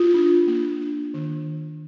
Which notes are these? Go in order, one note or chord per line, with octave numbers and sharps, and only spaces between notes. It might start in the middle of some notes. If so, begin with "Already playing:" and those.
Already playing: F4
D4
A#3
D4
D#3